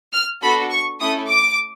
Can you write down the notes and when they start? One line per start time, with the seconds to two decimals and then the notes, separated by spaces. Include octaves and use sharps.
0.13 F6
0.42 B3 D4 F#4 A4 B5
0.70 C#6
1.00 A3 C#4 E4 A4 D#6
1.28 D6